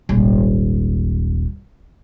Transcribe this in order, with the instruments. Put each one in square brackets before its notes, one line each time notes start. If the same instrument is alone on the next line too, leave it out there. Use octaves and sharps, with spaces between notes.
[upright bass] D#1 G#1